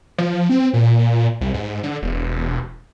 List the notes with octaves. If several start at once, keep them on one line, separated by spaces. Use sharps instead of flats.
F3
C4
A#2
C2
G#2
D3
E1